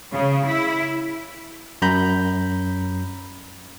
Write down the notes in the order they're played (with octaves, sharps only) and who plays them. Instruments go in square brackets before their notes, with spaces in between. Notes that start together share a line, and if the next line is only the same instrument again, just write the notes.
[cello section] C#3
E4
[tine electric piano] F#2 A#5 B5 G6